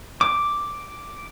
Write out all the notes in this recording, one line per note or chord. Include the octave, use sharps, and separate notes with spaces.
D6